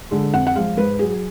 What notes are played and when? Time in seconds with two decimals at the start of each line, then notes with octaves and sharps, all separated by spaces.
0.11 D3 G#3
0.34 F2 F#5
0.47 F#5
0.56 F3 G#3 F5
0.77 G#2 B4
0.99 F#3 G#4